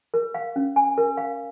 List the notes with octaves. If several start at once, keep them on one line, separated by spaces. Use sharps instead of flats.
A#4
F5
C#4
G#5
A#4
F5